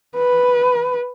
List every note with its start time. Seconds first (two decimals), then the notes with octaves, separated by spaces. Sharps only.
0.17 B4